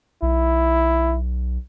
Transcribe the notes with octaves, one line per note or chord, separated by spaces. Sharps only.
B1 E4